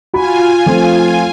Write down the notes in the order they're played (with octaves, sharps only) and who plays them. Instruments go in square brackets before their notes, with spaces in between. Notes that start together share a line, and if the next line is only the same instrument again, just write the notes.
[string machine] F4 G#5 [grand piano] F#4 B5
[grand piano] F3 A3 C4